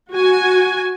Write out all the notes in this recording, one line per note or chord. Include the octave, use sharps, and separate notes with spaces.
F#4 G#5